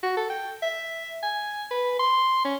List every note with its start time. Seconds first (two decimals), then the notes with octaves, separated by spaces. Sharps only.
0.03 F#4
0.17 A4
0.30 G5
0.63 E5
1.23 G#5
1.71 B4
2.00 C6
2.45 C#4